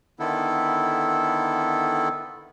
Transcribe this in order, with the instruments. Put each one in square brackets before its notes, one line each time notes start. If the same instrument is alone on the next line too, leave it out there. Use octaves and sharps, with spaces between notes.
[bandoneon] D3 D#3 B3 E4 A4